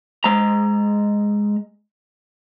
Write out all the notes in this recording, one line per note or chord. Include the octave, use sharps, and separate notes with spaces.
G#3 A#5